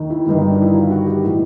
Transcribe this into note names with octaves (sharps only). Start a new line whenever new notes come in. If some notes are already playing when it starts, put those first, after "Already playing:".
Already playing: D#2 D#3
E4
G1 G2 D#3
D#4
D4
E4
F4
F#4
G4
A2 E3